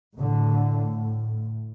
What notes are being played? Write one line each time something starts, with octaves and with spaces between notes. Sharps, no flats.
A2 D3